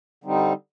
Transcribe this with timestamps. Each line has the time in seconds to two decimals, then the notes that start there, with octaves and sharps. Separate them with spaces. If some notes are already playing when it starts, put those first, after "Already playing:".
0.24 D3 G3 C4 D#4